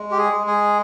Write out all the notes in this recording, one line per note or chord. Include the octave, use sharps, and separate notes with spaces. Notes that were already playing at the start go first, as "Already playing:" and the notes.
Already playing: G#3
G4
G#4
G#3
G#4